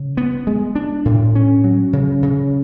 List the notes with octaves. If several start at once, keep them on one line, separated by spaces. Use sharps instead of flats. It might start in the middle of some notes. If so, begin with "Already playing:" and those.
Already playing: C#3
B3
G#3
D4
A2
C#4
F#3
C#3
C#3